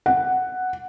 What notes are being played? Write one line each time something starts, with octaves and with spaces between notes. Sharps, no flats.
F#5